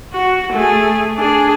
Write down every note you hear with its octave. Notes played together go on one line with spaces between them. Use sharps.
F#4
A3 G#4
D4 G#4